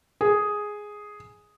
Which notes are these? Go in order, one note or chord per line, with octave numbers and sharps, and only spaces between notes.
G#4